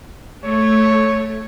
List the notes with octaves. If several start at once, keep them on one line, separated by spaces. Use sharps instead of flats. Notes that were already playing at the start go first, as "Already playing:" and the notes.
A3 C#5